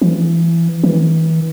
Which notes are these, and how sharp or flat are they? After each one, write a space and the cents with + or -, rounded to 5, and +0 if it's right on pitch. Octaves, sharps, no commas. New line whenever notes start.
E3 +20
E3 -35